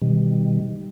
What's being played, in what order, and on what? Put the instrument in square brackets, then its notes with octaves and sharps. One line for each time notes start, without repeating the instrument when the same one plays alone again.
[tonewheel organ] B2 D#3 G3